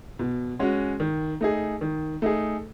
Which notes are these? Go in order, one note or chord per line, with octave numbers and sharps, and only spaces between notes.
B2
G#3 C#4 F#4
D#3
A3 D#4 G#4
D#3
A3 D#4 G#4